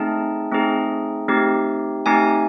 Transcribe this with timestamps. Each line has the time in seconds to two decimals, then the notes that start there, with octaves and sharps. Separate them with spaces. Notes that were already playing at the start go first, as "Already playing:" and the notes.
Already playing: A3 C4 D#4 G#4 A5
0.52 A3 C4 D#4 G#4
1.28 A3 C4 D#4 G4
2.06 A3 C4 D#4 G4 G#5